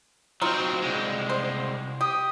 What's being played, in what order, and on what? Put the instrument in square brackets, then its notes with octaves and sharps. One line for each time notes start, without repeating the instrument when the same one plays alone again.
[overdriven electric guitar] F#3 C4 [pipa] D#4 F4
[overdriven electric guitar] C2 G#3
[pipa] C5
[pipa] G4 [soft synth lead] D#6